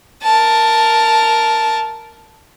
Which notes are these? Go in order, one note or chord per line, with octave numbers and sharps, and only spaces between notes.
A#4 A5